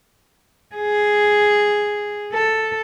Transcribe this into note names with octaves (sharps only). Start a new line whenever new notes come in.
G#4
A4